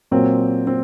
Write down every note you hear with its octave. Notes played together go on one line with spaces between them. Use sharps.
A#2 F#3 C4
C4